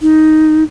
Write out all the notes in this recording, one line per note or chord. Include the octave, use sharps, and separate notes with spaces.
D#4